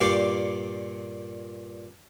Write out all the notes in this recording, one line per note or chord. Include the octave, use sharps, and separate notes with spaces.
G2 A#2 G4 D5 F5 C#6